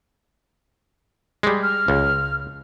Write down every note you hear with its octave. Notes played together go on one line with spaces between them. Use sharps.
G3 G#3
F6
C#2